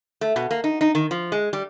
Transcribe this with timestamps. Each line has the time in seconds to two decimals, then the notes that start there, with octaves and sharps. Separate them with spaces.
0.21 A3
0.36 B2
0.51 A#3
0.64 D#4
0.81 D#4
0.95 D#3
1.11 F3
1.32 G#3
1.53 G3